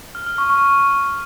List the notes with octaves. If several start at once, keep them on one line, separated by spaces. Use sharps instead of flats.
F6
F6
C#6
C#6